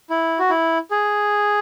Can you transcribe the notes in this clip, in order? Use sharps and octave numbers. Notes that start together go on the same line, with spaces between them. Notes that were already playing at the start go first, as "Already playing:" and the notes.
E4
F#4
E4
G#4